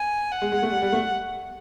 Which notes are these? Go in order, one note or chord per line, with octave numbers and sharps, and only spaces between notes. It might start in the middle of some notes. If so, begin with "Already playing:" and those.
Already playing: G#5
F#5
G#3
G#3
A3
G3
G3
A3